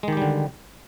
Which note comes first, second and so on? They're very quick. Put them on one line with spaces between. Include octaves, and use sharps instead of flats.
G#3 D#3 G4 G3 D3